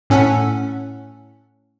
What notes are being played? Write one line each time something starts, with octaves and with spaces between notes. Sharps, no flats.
A2 C#4 A4 F#5 B6